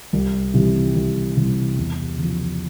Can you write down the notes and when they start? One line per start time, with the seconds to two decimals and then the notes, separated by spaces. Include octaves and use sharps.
0.13 C2
0.54 C3 E3 G3
0.95 C2
1.37 C3 E3 G3
1.77 E2
2.18 C#3 F3